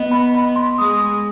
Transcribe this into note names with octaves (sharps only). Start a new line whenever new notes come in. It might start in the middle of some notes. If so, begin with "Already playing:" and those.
Already playing: B3 D#5
B5
B5
C6
G#3 D#6